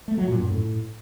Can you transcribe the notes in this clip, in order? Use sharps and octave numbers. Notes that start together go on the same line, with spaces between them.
A3
F#3
A#2
F#2
A2